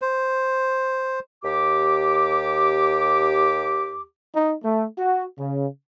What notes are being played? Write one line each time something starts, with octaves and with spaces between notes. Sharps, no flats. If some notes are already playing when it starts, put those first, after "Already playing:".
C5
D#2 G4 D6
D#4
A3
F#4
C#3